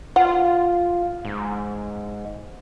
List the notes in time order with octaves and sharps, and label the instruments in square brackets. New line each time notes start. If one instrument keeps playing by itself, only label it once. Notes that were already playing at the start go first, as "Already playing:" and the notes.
[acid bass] F4 [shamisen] F#5
[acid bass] G#2